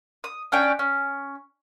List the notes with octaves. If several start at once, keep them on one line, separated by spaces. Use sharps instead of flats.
D#6
C#4 D4 C#5 G5
C#4